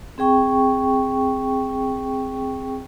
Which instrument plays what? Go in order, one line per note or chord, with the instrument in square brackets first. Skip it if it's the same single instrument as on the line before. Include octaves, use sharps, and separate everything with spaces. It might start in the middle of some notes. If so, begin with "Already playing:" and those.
[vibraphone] C4 G#4 G5 C#6